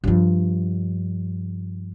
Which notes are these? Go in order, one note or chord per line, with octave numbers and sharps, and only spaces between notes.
G2 F3